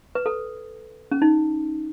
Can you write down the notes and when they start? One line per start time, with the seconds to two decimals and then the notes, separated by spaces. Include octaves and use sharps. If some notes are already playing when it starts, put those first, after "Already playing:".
0.15 B4
0.26 A4
1.11 C#4
1.22 D#4